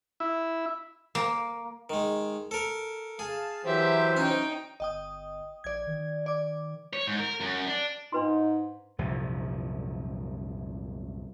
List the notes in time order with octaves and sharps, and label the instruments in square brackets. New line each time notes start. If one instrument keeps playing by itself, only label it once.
[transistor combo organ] E4
[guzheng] A#3
[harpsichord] D#3 G#3
A4 A#4
[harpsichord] G#4 [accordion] F5 A5
[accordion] E3 F#3 C5 [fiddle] G4 E5
[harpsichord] C#4 [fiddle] D#4 G5
[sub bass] G1 [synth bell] D#5 G5 D#6
[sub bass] A#1 [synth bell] D5 G#6
[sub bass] D#3
[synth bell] D5 D6
[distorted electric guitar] C#5
G#2
A#4
F#2
D4
[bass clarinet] G#2 [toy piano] D4 B4 C6 [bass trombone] D#4
[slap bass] C2 F#2 A#2 F3